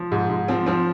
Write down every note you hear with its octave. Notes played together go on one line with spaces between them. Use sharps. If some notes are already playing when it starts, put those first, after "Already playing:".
Already playing: F3
G#2
G#2
F3 C4
F3 C4